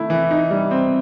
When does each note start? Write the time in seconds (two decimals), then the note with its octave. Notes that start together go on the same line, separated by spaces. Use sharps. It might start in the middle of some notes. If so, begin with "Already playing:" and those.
Already playing: D#3 A3 E4
0.10 E3
0.31 D#4
0.51 G3
0.71 C4